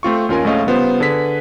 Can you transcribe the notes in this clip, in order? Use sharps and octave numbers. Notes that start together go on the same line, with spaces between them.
A3 C4 F4 C#6
D#2 C#4 F4 A#4 G#5
A#1 G#3 A3 C#4 D#5 F5
C#3 G3 B3 F4 C5
D3 G#4 B4 B6